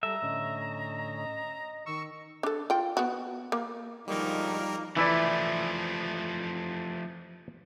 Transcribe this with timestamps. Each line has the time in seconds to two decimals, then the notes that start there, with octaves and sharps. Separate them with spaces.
0.03 G3 A4 E5 A#5
0.22 A2 D3 C#4 D#5
1.86 D#3 C#6 E6
2.43 D4 A4
2.70 F4 G5
2.97 B3 F#4
3.52 A#3
4.08 D2 G#2 D#3 F3 G3 A#3 D#4 A#4
4.97 E3 F3 A3 E4 D5